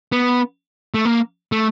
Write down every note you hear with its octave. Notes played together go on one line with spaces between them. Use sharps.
B3
A3
A#3
A3